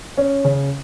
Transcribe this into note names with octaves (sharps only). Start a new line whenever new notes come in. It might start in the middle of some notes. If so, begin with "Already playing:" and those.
C#4
C#3